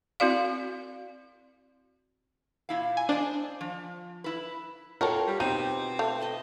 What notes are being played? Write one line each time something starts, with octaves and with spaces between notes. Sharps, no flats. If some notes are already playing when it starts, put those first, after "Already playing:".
C4 E4 F#4 D5 F5
A#2 E4 F5
G#5
D4 C5 D#5
F3
E4 B4
F4 F#4 A4 A#4 C#5 F#5 G5
G3
B2 C4 D#4 G4 D#7
A3
D#5 A5 B5